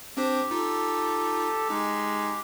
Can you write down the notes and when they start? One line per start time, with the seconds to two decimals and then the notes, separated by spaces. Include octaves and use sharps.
0.17 C4 D4 G4 C5
0.51 D#4 F4 A4
1.70 G#3 D#4